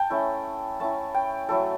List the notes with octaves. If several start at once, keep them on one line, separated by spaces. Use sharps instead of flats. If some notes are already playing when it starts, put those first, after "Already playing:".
Already playing: G5 A5
A3 C#4 E4
A3 C#4 E4 A5
G5
F#3 A3 E4 A4